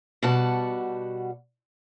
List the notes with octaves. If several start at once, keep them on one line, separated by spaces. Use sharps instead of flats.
B2 G3 F#4 F#5 A5